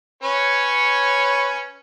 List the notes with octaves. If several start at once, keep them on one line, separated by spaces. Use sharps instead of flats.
C#4 B4 C#5